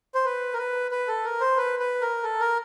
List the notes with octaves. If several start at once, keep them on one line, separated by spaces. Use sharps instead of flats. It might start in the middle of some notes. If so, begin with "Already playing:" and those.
C5
B4
A#4
B4
B4
A4
A#4
C5
B4
B4
A#4
A4
A#4